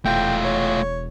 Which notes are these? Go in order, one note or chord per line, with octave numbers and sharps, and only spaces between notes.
E1 A3 F4 G5
C#5